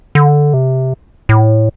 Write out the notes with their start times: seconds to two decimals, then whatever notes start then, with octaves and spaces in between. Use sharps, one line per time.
0.15 D3
0.54 C3
1.29 A2